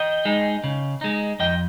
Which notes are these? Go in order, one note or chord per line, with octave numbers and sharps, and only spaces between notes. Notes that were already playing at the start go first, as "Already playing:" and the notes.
Already playing: D#5 G5
G#3 D#4
C#3
G#3 D#4
F2 D#5 G5